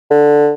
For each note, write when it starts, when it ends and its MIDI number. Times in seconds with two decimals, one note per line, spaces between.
0.11 0.53 50